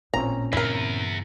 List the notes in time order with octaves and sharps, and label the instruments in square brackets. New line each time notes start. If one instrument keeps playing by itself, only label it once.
[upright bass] A1 [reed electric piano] A#2 C4 C#4 [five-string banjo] A#5
[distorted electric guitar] E2 [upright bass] G2 C#3 [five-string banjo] E4 A#4